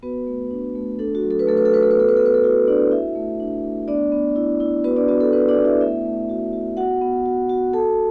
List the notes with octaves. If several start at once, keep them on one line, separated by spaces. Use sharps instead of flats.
B3 F#4 B4
A3
D4
A3
D4 A4
F#4
F#3
A4
B4
A3 A4
B4
A4
F#4 B4
A4
B4
B3 A4
B4
B3 A4
B4
A4
E4 F#4
D4 E4 D5
E4 F#4 E5
A3
D4
A3
B3 D4 D5
B3
E4
E4
B3 F#4 B4
D4 D5
B3 F#4
A4
B3 D4 B4
D4 D5
B3
E4 E5
A3 E4 E5
A3
F#4
F#4
B3 F#4 F#5
B3
F#4
F#4
F#4 A4 A5